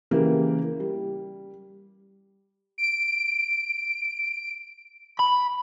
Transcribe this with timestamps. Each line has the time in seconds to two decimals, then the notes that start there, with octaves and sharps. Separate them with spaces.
0.11 C#3 E3 A#3 G4
0.80 G3
2.78 D7
5.19 B5